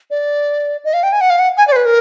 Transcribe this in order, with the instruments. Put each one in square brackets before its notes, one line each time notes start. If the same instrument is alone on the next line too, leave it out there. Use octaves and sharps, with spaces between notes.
[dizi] D5
D#5
F5
G5
G#5
F#5
F5
F#5
G#5
D5
C5
B4
A#4